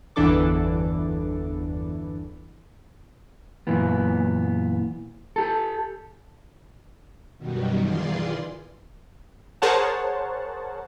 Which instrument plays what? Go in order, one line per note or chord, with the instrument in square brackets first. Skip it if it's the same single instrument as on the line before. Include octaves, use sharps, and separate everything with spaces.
[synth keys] G1 E2 E3 D4 A4 D6
[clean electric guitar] F#2 A#2 E3 B3
G4 A4
[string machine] F#2 B2 D#3 F#3 G3
D#3 E3 F4 G#4 D5 C6
[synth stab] G#4 A#4 C5 C#5 F#5 A5